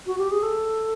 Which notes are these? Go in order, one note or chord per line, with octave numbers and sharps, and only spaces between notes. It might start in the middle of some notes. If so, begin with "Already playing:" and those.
F#4
G4
G#4
A4